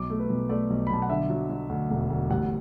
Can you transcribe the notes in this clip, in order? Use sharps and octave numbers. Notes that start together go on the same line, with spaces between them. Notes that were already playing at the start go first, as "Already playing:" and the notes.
Already playing: B1 D6
A3
B4
B1
A3 D5
B1
B5
B1 A5
F#5
D3 E5
F#3
F#3
D2
E1
D2
A1 F#5